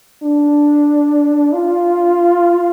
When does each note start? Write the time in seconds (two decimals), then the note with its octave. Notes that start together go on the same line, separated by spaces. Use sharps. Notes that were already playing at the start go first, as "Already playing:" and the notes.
0.23 D4
1.53 F4